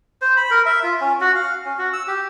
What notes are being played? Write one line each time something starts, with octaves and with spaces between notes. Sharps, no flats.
C5
B5
A#4
E5
F4
C#4
F#4
F5
C#4
F#4
E6
G4